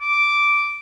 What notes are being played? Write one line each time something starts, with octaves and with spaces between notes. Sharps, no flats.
D6